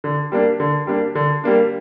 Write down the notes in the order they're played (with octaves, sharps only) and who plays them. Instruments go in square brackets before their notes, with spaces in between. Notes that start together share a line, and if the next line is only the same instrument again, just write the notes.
[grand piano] D3
G3 A#3 D4
D3
G3 A#3 D4
D3
G3 A#3 D4